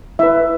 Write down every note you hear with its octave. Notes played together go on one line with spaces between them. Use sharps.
E4 B4 E5